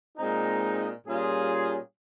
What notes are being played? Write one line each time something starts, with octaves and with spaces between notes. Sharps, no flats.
A#2 G#3 C4 D#4
A#2 G3 C#4 F4 G#4